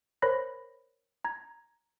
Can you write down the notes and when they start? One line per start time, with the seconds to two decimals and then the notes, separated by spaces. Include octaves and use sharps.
0.22 A#4 C5 C#5 B5 F#6 A#6
1.25 A#5 G#6